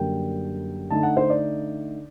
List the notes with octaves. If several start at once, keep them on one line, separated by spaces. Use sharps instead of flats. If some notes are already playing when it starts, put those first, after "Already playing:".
Already playing: F#2 D3 G3 A#3 G5
D3 A3 D#4 A5
F#5
C5
D5